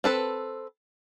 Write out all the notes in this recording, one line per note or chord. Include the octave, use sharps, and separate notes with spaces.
C4 A4 B4